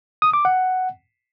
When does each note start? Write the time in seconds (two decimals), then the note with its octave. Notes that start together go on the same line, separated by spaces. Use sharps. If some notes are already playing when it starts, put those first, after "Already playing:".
0.22 D#6
0.33 D6
0.45 F#5